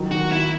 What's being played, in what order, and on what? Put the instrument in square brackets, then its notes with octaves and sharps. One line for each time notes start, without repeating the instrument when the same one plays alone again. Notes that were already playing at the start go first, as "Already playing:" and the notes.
Already playing: [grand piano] D#3 F#3
[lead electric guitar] F#4
E4